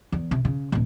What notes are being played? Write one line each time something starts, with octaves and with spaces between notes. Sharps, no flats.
E2
C3
C#3
D1 A#1